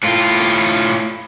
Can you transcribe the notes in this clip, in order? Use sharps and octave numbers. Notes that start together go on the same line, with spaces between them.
A2 F4